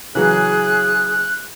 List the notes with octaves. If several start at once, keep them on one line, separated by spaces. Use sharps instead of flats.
C#3 E3 F#3 G#4 F#6